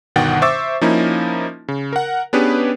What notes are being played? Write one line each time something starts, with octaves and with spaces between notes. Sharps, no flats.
G1 B2 D#3 F#5 G5 A6
C5 E5 C#6 D6 E6 A6
F3 A#3 C#4 D#4 E4
C#3
A#4 F#5
B3 C#4 D4 G4 G#4 B4